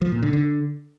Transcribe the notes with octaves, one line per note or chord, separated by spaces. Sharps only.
F3
A#2
D3
D3